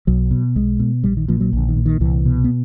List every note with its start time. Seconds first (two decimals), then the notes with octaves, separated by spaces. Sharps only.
0.07 B1 F#3
0.31 B2
0.56 B1 G#3
0.79 B2
1.04 A#1 G3
1.17 D#3
1.28 A#2 F3
1.40 F#3
1.53 A#1 D3
1.69 D#3
1.76 A#2
1.86 D#3
2.01 C2 E3
2.26 B2
2.44 B3